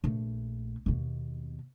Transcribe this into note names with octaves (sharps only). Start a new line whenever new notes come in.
A#1 A3
D#2 B2